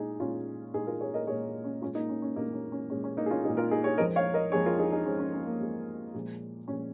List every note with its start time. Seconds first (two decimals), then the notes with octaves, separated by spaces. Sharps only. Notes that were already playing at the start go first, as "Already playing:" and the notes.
Already playing: A#2 G#3 D#4 G#4
0.20 A#2 G#3 C#4 F4
0.74 A#2 D#4 G#4
0.78 G#3
0.87 F4 A#4
1.01 G#4 C#5
1.14 A#4 D#5
1.27 A#2 G#3 G#4 C#5
1.47 A#3
1.64 C#4
1.82 G#3 C#4 F4
1.85 A#2
1.95 A#3 D#4
2.09 C#4
2.22 C#4
2.36 A#2 A#3 D#4
2.39 G#3
2.53 C#4
2.72 C#4
2.90 A#2 G#3 C#4
3.04 C#4
3.17 A#3 D#4
3.26 G#4
3.31 C#4 F4
3.44 A#2 G#3 D#4 G#4
3.57 F4 A#4
3.71 D#4 G#4
3.84 G#4 C#5
3.98 F2 F3 G#3 A#4 D#5
4.16 C#5 F5
4.34 A#4 D#5
4.52 F2 F3 G#3 G#4 C#5
4.66 F4 A#4
4.79 D#4 G#4
4.92 D#4 G#4
5.06 F2 F3 G#3 C#4
5.19 C#4
5.34 C#4
5.47 A#3
5.60 F2 F3 G#3
6.14 A#2 F3 G#3
6.68 A#2 F3 G#3 C#4